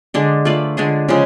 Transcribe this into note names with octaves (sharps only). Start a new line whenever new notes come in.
D3 G#3 D4
A3 F4 B4 D5
D3 G#3 D4 G#4
C#3 F3 G#3